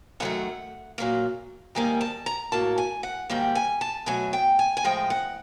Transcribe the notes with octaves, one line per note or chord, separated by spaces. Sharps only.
F#2 D#3 F#3 A3 F#5
A#2 F#3 A#3
G#2 D#3 G3 A#3 G#5
A5
A#5
A2 F#3 A#3 A5
G#5
F#5
G#2 D#3 G3 A#3 G5
G#5
A5
B2 F#3 A3 G#5
G5
G#5
G#5
A2 F3 G#3 G5
F#5